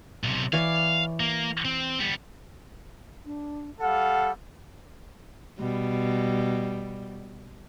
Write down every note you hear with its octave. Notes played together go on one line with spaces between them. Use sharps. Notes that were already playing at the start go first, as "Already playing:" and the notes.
B1 C3
E3 C#5 D5 F5
A#3
C4
G3 B3
D4
G3 A4 F5 F#5
B2 G3